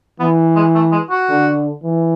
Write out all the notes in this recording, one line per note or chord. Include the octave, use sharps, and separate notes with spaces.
E3 B3
G#3
A3
G#3
F#4
D3
E3